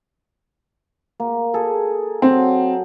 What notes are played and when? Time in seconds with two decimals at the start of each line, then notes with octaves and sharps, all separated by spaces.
1.20 A#3
1.54 G#4 A4
2.22 F#3 C4